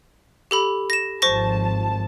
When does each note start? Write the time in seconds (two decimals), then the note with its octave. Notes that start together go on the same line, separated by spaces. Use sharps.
0.51 G4 A4 B5
0.90 A#6 E7
1.22 G#1 F3 C5 A5 C#6 A#6